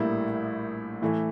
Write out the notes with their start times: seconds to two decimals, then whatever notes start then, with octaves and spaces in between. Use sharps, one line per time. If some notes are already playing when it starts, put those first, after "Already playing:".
Already playing: A#1 A2 G3 A#3 E4
1.02 A2 E3 A3 E4